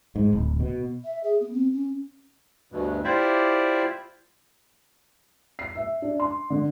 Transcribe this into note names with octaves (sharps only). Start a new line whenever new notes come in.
G#2
D1
B2
E5
G#4
B3
C4
C#4
D2 G2 B2
E4 F4 G4 C5 D5 E5
C7
E5
D4
C6
D3